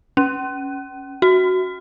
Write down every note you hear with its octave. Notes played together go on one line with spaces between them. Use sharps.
C#4
F#4